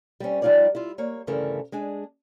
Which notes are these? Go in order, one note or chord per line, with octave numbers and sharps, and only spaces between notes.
G3 C4 C#4
F3 G3 D#4 F4 C#5 D5
E4 F4
A#3 C#5
D2 G2 C#3 E3 A3 A#4
G#3 D4 G#4